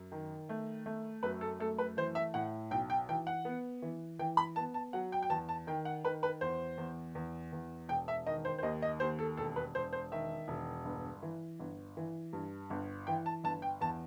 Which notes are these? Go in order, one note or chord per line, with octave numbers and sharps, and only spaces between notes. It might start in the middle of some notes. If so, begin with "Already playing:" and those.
Already playing: F#2
D#3
A3
A3
F#2 B4
A4
A3 A4
B4
E3 C5
E5
A2 F#5
B1 G5
G5
E3 G5
F#5
B3
E3
E3 G5
B5
B3 A5
A5
F#3 F#5
G5
G5
E2 A5
A5
D#3 G5
F#5
D#3 B4
B4
E2 C5
E2
E2
E2
E1 G5
E5
D#3 D#5
C5
C5
D#2 D#5
D#5
D#2 C5
A4
E1 A4
B4
E1 C5
C5
D#3 E5
E1
G1
E3
G1
E3
G2
G1
E3 G5
A5
G1 A5
G5
E2 A5